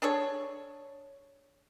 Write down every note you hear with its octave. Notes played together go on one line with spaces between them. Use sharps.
D4 G#4 A4 C#5